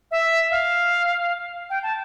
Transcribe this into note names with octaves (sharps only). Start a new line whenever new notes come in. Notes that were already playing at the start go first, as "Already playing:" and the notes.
E5
F5
G5
A5